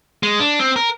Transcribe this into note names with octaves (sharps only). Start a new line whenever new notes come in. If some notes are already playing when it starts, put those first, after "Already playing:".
G#3
D4
C4
A#4